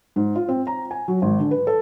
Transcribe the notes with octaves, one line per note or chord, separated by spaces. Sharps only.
G#2
F4
C4
A#5
G#5
F#3
G#1
D3
B4
A4